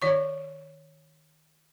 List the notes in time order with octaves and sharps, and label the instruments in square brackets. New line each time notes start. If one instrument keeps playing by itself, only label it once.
[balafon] D#3 C#5 C#6